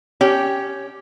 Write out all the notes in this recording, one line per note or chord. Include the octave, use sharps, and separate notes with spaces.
C#4 G4